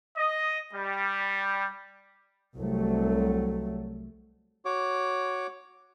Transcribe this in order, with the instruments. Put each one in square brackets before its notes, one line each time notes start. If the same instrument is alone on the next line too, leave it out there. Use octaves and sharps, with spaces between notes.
[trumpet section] D#5
G3
[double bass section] C2 F#3 A3
[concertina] F#4 C#5 D6